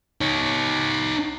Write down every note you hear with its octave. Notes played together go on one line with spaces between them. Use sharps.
D#4 C#5